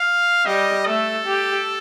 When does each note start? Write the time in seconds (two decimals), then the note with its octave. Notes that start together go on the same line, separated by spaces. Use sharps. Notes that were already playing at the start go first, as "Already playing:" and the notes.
Already playing: F5
0.46 G3 D#5
0.86 A3 A4
1.26 G4